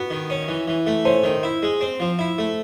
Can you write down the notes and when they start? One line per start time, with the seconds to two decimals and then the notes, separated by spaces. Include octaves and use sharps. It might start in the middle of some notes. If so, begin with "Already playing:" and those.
Already playing: B3 F#4
0.10 D#3
0.30 C#4
0.48 E3
0.68 E3
0.87 A3
1.05 C#4 C5
1.24 D#3
1.43 E4
1.62 G#3
1.81 C4
2.00 F3
2.19 E4
2.38 A3